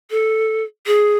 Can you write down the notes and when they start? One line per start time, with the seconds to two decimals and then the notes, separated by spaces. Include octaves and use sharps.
0.11 A4
0.87 G#4